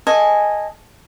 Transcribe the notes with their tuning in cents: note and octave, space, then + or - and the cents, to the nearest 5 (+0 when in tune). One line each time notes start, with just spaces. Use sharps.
A4 +0 D#5 +0 G#5 -10